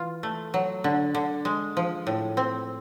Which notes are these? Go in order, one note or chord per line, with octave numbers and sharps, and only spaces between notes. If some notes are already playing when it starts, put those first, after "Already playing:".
Already playing: E3 F4
A3
F#3
D3
D3
G#3
F3
A2
C4